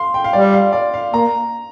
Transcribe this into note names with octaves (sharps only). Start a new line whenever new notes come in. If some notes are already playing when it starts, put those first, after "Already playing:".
Already playing: F5 C6
G5
F5
G3 D5
F5
D5
F5
A#3 A#5